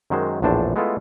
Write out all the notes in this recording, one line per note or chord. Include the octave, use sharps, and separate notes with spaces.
F#2 D#3 F#3 G#3 C5
A#1 E2 A2 D4 C5 A5
G#3 A3 B3 E4 F4 A4